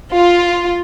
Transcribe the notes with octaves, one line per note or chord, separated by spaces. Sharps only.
F4